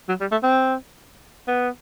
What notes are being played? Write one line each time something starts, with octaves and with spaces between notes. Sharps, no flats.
F#3
G3
A3
C4
B3